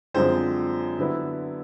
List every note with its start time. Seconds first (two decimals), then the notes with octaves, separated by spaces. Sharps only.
0.14 F#2 D3 F3 G#3 C4 C5
0.99 D3 F#3 B3 E4